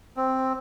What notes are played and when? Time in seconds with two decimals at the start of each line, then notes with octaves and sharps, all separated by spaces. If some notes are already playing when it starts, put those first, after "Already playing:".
0.17 C4